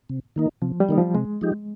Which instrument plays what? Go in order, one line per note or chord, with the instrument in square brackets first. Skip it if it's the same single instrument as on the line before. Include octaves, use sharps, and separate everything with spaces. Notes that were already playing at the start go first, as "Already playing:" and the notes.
[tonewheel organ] C3
D#3 A#3 D#4
[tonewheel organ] C3 [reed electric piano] F3
[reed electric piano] G3
[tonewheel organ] D#3 A#3 D#4
[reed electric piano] F3
[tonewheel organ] C3 [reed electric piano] G#3
[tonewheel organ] F3 G#3 D#4 G4